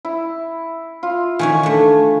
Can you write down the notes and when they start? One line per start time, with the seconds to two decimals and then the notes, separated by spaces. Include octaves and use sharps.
0.05 E4
1.03 F4
1.39 D#3 E3 C#4 C#5 G#5
1.63 D3 A3